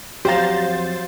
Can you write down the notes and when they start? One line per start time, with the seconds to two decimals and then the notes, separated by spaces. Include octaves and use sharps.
0.25 F2 F#3 G4 C5 F5 A#5 A6